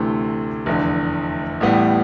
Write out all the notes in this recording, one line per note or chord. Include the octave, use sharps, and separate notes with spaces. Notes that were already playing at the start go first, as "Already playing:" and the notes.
Already playing: D2 C3 E3 A3
F1 E2 D3
A1 A2 G3 B3